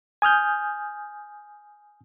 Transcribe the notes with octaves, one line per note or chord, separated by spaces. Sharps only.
G#5 D#6 F6 G6